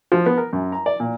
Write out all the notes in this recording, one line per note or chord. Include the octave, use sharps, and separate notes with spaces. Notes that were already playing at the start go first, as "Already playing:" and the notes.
F3
B3
A#4
F#2
A#5
D5
A#2